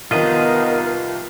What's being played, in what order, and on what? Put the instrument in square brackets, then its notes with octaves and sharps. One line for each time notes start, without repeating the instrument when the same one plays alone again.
[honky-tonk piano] C2 D#3 F3 [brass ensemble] B3 D#4 [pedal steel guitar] F4 D#5 [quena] A#4